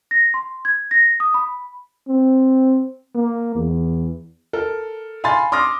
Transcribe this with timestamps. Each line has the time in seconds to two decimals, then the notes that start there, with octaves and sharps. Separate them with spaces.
0.11 A#6
0.34 C6
0.65 G#6
0.91 A#6
1.20 D#6
1.34 B5
2.08 C4
3.15 A#3
3.55 E2
4.53 A4 A#4
5.24 F5 G#5 B5 C6 A6
5.52 C6 D6 D#6 F6 A#6